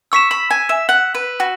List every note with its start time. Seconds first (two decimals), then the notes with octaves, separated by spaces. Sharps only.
0.12 C#6 E6 B6 E7
0.31 B5
0.50 G#5
0.69 E5
0.89 F#5
1.15 B4
1.40 F#4